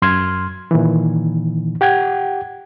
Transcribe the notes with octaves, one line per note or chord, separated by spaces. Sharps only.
F#2 C6 F6 G#6
A#2 D#3 E3
G4 F#5 G5 G#6